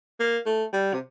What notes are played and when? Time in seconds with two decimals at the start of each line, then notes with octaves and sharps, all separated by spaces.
0.20 A#3
0.46 A3
0.73 G3
0.94 C3